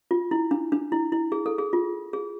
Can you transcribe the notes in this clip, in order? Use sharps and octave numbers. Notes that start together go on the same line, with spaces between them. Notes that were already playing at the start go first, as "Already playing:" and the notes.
F4
E4
D4
D4
E4
E4
G#4
A4
G#4
F4
G#4